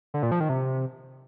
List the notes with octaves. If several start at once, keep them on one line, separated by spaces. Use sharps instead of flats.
D3
A#2
F3
D#3
C3